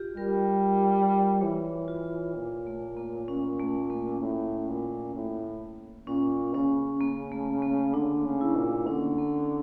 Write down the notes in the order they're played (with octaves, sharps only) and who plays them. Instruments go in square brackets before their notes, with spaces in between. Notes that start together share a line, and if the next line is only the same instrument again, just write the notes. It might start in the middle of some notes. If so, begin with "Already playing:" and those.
Already playing: [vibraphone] F4 G4
[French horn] G3 [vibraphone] A#4
[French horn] E3 [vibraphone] C#5
[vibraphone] F4
[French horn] A#2
[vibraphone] A3
A#3
C#4
A3
A#3
[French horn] A2
A#2
A2
[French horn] A#2 [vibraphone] C#4
[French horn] C#3 [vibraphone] C#4
[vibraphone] A#3
A3
A#3
[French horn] D3 [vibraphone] D4
[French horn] C#3
[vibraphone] E4
[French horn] A#2
[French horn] D3 [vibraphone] C#4
[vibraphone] A#3